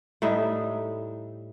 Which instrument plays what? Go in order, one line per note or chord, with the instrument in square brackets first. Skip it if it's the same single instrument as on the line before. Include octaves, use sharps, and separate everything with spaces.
[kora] A2 G3 D#4 E5